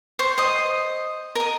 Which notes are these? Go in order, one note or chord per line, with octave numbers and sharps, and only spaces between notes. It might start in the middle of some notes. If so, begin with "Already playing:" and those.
C5 C#6
C5 D#5 D#6
A#4 D#5